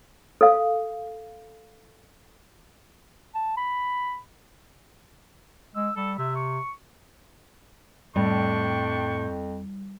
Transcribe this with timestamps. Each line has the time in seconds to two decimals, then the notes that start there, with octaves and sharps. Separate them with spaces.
0.41 A4 F5
3.35 A5
3.57 B5
5.75 G#3 E6
5.97 G3 A4
6.18 C3 E5
6.35 C#6
8.16 F2 A2 G3 D4 G5 C#6